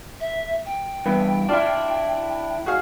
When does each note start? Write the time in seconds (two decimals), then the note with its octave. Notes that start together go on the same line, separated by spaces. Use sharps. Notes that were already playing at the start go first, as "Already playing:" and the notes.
0.20 E5
0.66 G5
1.06 G2 E3 B3
1.49 D4 E4 F4 D5
2.66 F#4 G#4 F5